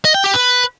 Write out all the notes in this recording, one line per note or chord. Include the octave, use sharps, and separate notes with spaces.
D#5
G5
G4
B4